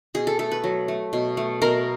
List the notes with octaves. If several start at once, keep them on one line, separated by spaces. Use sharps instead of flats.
B2 G#4
A4
A3 A4
B4
F#3
A3
B2
A3
B2 A#4